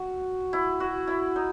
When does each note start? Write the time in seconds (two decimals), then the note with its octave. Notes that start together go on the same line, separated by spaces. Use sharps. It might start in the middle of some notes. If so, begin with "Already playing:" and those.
Already playing: F#4
0.53 E4
0.80 F#4
1.07 E4
1.36 D#4